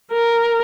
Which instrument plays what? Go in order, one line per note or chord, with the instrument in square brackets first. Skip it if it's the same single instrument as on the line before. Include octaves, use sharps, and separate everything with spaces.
[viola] A#4